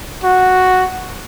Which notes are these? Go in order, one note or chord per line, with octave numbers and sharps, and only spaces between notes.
F#4